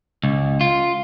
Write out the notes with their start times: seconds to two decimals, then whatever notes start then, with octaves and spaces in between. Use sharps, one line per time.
0.24 C#2
0.61 F4